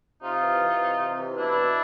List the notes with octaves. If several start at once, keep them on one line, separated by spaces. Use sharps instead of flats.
C3 D#4 F4
E3
E3
C3
C3
E3
B2 D4 E4
B2